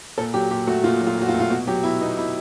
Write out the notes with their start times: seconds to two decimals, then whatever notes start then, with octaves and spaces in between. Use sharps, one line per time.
0.18 A#2 A4
0.34 F#3 G4
0.51 A#2 G4
0.67 A3 F#4
0.84 A#2 F4
1.01 F#3
1.07 F4
1.17 A#2 F#4
1.29 F4
1.34 A3
1.40 F4
1.50 B2 F#4
1.67 F#3 G4
1.83 B2 E4
2.01 B3 D#4
2.17 B2 E4